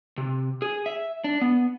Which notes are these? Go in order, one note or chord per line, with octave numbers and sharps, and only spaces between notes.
C3
G#4
E5
D4
B3